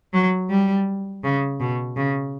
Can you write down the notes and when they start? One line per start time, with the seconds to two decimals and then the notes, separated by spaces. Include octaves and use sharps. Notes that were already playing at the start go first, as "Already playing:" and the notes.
0.13 F#3
0.49 G3
1.23 C#3
1.59 B2
1.96 C#3